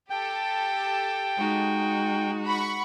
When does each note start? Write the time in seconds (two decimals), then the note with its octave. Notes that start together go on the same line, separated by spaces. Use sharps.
0.10 G4 A4 G5 A5
1.36 G#3 D#4 F#4
2.45 F#5 B5 C#6